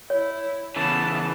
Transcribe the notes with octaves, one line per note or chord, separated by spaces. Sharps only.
E4 C#5
C#3 E3 B3 A5